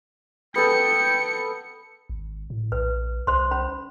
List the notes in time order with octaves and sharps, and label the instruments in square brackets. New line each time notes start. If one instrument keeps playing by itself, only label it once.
[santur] B3 A4 [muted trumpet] G5 [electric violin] C#7
[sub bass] G#1
A2
[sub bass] A#1 [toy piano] B4
[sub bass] C2 [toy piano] C5 C6
[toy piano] C#4 C5 B5